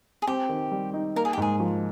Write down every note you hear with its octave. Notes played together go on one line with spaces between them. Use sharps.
G#4
C4 G4
D#3
G3
D#4
A#3 A#4
G#4
G4
G#2 G#4
F3